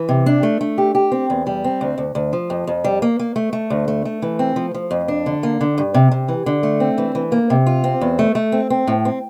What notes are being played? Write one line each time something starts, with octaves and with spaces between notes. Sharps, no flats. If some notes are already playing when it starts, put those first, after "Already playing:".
Already playing: E3
C3
D4
A3
A3
G4
G4
C4
E2
G3
C4
D2
D2
D2
F3
F2
F2
G3
A#3
A#3
A3
A3
D2
A3
A3
E3
C4
F3
F3
F2
D4
D3
A#3
D3
G2
C3
C3
E3
D3
A3
C4
E3
E3
A#3
C3
F4
C4
E2
A3
A3
C4
C4
A2
C4